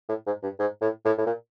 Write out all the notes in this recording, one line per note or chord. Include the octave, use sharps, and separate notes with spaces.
A2
G#2
G2
G#2
A2
A2
A2
A#2